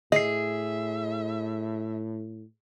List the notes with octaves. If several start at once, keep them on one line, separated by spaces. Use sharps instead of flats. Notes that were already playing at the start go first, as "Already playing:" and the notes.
A2 G#4 D#5 E5 C7